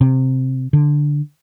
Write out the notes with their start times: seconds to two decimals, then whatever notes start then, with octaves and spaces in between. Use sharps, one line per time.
0.01 C3
0.73 D3